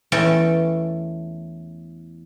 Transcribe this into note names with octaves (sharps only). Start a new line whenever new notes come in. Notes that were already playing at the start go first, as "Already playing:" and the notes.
E2 A3 C#4 A4 G5